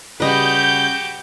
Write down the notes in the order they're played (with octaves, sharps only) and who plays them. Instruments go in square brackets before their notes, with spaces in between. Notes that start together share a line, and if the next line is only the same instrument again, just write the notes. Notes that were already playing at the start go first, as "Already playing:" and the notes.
[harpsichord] C#3 G3 [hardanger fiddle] F#4 G4 [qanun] B4 D#5 [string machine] G6